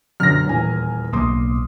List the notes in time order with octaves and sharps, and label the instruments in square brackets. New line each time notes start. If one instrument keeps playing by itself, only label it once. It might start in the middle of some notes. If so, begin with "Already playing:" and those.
[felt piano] F#2 B2 D3 [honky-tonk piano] F6 A#6
[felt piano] D#1 E2 G#5
[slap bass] B1 A#3 [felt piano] C6 D6 D#6